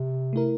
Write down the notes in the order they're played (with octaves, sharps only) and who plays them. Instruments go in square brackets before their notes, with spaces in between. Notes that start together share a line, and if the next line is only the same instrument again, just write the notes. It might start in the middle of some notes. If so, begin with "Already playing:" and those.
Already playing: [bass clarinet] C3
[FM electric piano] A3 E4 A#4